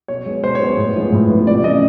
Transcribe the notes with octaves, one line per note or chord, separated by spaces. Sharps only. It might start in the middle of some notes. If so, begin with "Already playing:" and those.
B2 C#5
G#3 B3
B2 C5
C#5
G#3 B3
A2
F3 G#3 B3
A2
F3 G#3 B3
C3 D5
E3 A3 C#4 D#5